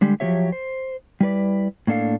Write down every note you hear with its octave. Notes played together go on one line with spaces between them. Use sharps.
D3 G3 G#3 G4
F3 F#3 G#3 G4 C#5 E5
C5
G3 E4 B4 D5
A2 A#3 D4 A4 F5